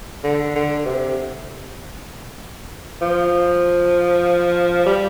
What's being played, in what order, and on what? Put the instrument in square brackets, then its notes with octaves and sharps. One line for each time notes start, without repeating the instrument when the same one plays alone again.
[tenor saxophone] D3
D3
C3
F3
G3